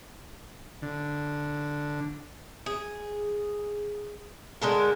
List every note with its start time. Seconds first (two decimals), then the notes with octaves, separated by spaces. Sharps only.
0.82 D3
2.66 G#4
4.62 D3 G#3 A4 A#4